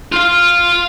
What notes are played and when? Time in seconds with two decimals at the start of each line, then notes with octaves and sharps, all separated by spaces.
0.12 F4 F5